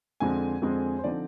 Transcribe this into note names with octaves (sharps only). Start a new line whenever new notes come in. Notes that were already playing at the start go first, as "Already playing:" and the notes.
F2 D3 G#3 C4 G#5
F2 D3 G#3 C4
C5
D3 F3 C4 D#4 D5